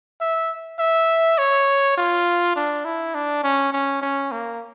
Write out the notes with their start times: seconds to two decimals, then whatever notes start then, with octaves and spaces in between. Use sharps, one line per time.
0.21 E5
0.79 E5
1.38 C#5
1.97 F4
2.56 D4
2.85 E4
3.15 D4
3.43 C#4
3.73 C#4
4.02 C#4
4.32 A#3